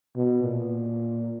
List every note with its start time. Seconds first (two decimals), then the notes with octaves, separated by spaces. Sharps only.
0.16 B2
0.44 A#2